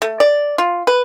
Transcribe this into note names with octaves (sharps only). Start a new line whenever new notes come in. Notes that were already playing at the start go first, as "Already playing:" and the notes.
A3
D5
F4
B4